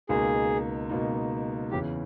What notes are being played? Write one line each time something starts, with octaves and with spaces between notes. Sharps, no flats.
C#2 B2 A#3 D#4 G#4
C#2 B2 A#3 D#4
E2 C#3 E3 G4